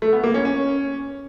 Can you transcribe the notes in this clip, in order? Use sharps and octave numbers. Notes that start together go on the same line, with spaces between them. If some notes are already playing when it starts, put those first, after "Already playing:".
A3
B3
A#3
C#4
C#4